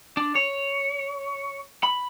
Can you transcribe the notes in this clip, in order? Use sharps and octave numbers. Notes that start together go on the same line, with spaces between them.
D4
C#5
B5